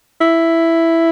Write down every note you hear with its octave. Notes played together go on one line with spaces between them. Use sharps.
E4